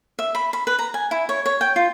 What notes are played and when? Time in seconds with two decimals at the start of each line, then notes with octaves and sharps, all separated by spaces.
0.19 E5
0.35 B5
0.53 B5
0.67 B4
0.79 A#5
0.94 G#5
1.11 E4
1.29 C#5
1.46 C#5
1.61 G5
1.76 F4